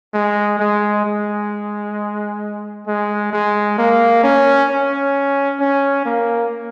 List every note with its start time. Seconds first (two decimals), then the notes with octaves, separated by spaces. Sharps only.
0.14 G#3
0.59 G#3
1.05 G#3
2.87 G#3
3.32 G#3
3.78 A#3
4.23 C#4
4.69 C#4
5.60 C#4
6.05 A#3